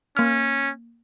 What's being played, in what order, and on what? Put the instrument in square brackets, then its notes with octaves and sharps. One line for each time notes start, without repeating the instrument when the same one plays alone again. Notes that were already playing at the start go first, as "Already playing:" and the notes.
[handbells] A#3 F6 [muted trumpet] C#4